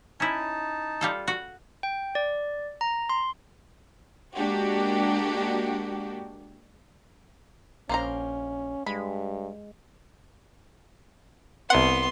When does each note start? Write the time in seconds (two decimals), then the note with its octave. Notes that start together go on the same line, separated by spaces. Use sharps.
0.20 C#4 D#4 E4 A5
1.01 G3 F4 A4
1.28 F#4
1.83 G5
2.15 D5
2.81 A#5
3.09 C6
4.36 G#3 A#3 D4 F#4 G4
7.89 A#1 A#3 C#4 C5 A#5
8.86 G2 G#3 B5
11.70 C2 B3 F#5 C6